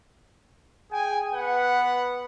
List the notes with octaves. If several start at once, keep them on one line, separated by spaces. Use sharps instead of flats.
G#4 G5 G#5
B3 B4 F#5